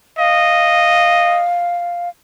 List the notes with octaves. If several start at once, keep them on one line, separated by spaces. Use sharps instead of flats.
D#5 F5